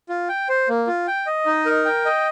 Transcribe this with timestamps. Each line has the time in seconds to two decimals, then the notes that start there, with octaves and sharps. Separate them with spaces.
0.09 F4
0.29 G5
0.49 C5
0.69 A#3
0.87 F4
1.07 G5
1.27 D#5
1.46 D#4
1.66 A#4
1.85 G5
2.05 D#5